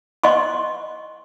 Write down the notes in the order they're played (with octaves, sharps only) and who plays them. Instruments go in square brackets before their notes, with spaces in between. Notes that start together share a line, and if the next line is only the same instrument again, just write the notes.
[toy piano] D#5 C6 C#6